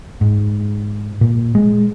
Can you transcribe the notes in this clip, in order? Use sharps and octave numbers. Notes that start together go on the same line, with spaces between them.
G#2
A#2
G#3